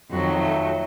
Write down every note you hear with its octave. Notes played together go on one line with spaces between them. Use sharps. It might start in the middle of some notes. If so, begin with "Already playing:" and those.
F2 D#3 F#3 F#4
A3